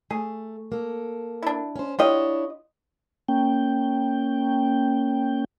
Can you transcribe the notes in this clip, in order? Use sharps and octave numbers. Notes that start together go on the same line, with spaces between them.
A3 G#4
A#3 A4
D4 E4
C#4 C5
D4 E4 F4 G4 C#5 D#5
A#3 C#4 G5